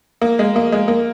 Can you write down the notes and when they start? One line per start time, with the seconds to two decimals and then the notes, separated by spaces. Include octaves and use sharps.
0.21 A#3
0.39 G#3
0.56 A#3
0.72 G#3
0.88 A#3